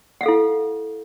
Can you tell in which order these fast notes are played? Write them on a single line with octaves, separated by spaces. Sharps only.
F#5 F5 A4 E4